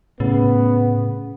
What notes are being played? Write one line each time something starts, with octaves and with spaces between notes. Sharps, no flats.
A2 C#3 B3